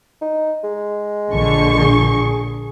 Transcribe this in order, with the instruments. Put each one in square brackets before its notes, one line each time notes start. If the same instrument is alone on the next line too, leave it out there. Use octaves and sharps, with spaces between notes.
[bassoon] D#4
G#3
[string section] A#1 D3 C#6
[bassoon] G#4